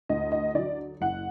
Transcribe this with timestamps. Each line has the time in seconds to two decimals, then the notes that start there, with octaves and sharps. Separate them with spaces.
0.09 D2 D#5
0.32 D#5
0.55 D3 F#3 D5
1.01 F#1 F#5